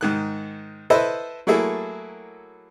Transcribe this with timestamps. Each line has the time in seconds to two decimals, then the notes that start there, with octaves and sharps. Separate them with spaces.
0.01 G#2 D#3 F#6
0.90 E4 A4 B4 C5 D#5 E5
1.47 F#3 A3 A#3 E4 G#4 A4